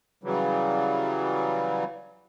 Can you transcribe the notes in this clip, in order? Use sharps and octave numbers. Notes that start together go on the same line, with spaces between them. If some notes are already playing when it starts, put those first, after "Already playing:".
C#3 E3 F#3 G3